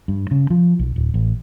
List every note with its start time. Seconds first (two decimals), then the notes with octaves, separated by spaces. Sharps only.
0.08 G2
0.31 C#3
0.50 F3
0.79 B1
0.96 D1
1.14 A1